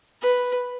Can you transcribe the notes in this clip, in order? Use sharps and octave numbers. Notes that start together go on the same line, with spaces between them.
B4